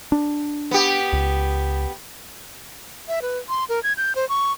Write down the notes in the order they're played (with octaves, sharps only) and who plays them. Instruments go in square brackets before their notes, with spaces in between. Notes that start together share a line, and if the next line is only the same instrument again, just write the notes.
[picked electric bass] D4
[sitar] B3 G4
[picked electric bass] C#2
[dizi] E5
B4
C6
A#4
G#6
G6
C5
C#6